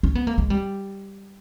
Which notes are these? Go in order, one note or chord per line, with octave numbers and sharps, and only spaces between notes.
C#4
B3
A#3
G#3
G3